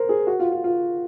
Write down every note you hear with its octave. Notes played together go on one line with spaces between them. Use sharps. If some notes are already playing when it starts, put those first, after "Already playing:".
Already playing: A#4 C5
G#4
F#4
F4
F4
F4